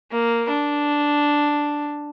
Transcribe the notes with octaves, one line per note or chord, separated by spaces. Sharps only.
A#3
D4